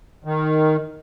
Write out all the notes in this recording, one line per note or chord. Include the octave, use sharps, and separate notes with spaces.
D#3